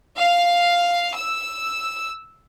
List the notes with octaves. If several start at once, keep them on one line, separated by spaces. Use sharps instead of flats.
F5
E6